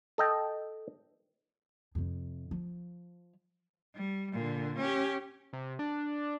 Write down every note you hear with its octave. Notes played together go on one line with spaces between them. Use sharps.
A4 D#5 G5
F2 C3
F3
G3
A#2 D3
C#4 G4
C3
D4